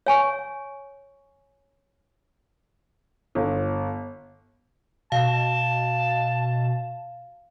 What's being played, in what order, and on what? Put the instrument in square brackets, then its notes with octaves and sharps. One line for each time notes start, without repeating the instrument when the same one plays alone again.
[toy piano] C#5 G#5 C#6
[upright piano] G1
[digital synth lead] B2 [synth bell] F5 [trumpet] A5